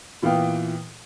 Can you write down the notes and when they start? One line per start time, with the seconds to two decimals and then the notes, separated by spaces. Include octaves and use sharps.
0.22 A#2 E3 B3 F5 G5